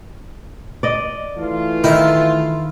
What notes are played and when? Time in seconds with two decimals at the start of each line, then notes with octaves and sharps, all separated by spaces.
0.83 D5 D#5
1.36 E3 A3 F4
1.84 D#3 E4